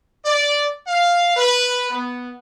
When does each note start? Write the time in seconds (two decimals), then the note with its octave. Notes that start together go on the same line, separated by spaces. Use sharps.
0.24 D5
0.87 F5
1.36 B4
1.89 B3